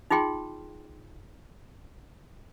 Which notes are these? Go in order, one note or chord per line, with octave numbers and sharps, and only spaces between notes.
D#4 F4 G#4 G5 C6